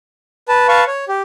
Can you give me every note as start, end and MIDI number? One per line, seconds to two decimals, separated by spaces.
0.48 0.68 71
0.48 0.68 81
0.69 0.84 71
0.69 0.84 77
0.69 0.84 81
0.69 0.84 85
0.87 1.05 73
1.08 1.22 67